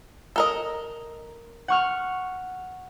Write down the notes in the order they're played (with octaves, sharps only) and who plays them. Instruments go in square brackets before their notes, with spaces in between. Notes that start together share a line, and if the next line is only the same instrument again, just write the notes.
[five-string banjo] A4 A#4 D#5
[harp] F#5 C#6 F6